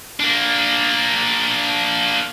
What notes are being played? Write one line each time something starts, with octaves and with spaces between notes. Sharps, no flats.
A#3 D4